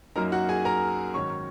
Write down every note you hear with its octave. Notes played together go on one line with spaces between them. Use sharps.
F#2 F#3 A#3 D#4 A#4 A#5
F#4 F#5
G#4 G#5
A#4 A#5
G#2 D#3 F#3 C#4 C#5 C#6